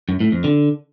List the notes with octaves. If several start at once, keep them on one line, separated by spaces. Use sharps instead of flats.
F#2
A2
F2
D3